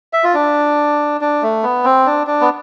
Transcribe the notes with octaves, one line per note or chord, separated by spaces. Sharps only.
E5
F4
D4
D4
A3
B3
C4
D4
D4
B3